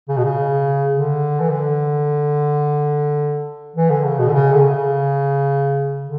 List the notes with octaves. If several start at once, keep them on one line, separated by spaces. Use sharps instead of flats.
C#3
B2
C#3
D3
E3
D3
E3
D3
C#3
B2
D3
C#3
D3
C#3
D3